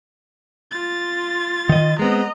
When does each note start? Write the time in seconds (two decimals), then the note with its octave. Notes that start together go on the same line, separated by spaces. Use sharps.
0.71 F4 A6
1.69 D#3 D#5
1.99 G#3 B3 C4 D#5 A#5